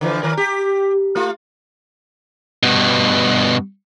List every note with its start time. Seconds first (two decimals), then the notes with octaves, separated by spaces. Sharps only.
0.01 D3 E3 F3
0.23 D#3 A#4
0.37 G4
1.16 A3 F4
2.63 G2 B2